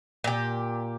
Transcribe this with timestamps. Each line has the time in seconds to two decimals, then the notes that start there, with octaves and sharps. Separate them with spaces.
0.24 A#2 G4